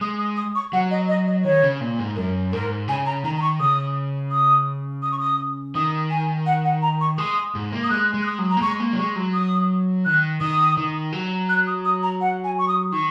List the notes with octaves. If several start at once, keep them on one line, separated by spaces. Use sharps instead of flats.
G#3 D#6
D#6
D#6
C#6
F#3 F#5
D#5
D#5
D#5
D#3 C#5
C#3
A#2
G#2
F#2 A#4
G#2 A#4
C#3 G#5
A#5
D#3 A#5
A#5
C#6
C#3 D#6
D#6
D#6
C#6
D#6
D#3 D#6
G#5
F#5
F#5
A#5
C#6
G#3 D#6
G#2
A#3
D#6
G#3 F#6
G#3
F#6
D#6
F#3
A#5
A#3
G#3 C#6
A#3
F#3
G#3 C#6
F#3
D#6
D#3 F#6
D#3 D#6
D#3
F#3
F#6
D#6
D#6
A#5
F#5
G#5
C#6
D#6
D#3 C#6